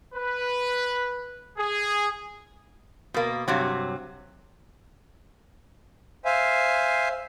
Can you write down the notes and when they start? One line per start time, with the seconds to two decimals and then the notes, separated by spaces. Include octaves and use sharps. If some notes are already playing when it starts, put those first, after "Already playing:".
0.14 B4
1.58 G#4
3.14 B2 A#3
3.48 G2 C3 F#3
6.25 C5 E5 F5 G#5